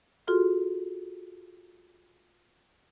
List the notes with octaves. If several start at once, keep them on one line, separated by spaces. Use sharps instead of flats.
F4 F#4 G#4 A4 C6 F6